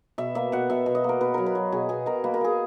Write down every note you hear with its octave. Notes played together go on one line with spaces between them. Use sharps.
B2 E5
A#3 E5
B2 F#5
B2 E5
B2
D#5
A#3 A#4
B2 B4
F#3 A#4
B4
F#3
B2 G#4
B2 G#4
B2 A#4
A#3 B4
A#4
A#3 G#4